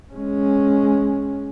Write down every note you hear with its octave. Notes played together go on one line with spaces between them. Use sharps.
G#3 C#4